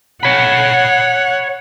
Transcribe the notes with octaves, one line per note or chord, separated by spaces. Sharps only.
C#5 F#5 B5